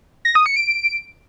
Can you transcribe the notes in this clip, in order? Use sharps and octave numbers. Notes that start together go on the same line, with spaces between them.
A#6
D#6
C#7
D7